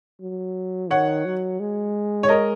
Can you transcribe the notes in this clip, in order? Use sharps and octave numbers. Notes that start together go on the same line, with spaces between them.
F#3
D#3 C#5 F#5
F#3
G#3
C#5
A#4 D#5